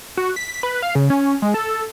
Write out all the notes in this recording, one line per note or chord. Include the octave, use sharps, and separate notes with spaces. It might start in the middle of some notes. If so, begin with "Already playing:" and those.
F#4
B6
B4
F5
C#3
C#4
G#3
A4